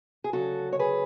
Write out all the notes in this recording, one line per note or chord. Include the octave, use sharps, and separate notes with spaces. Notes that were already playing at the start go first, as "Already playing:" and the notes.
G#4
D2 C#3 F#3 F#4 A4
C#5
G#4 B4